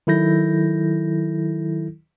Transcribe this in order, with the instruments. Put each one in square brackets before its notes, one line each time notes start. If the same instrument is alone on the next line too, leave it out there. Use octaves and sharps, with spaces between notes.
[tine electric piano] D#3 F#3 E4 A4 G6 A#6